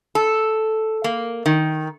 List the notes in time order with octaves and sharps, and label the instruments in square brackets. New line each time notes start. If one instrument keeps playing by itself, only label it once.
[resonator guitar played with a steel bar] A4
A#3
D#3